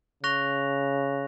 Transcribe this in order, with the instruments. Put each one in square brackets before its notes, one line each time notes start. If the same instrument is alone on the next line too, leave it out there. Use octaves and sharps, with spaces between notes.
[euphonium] C#3 [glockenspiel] C#6 F#6 A#6 F7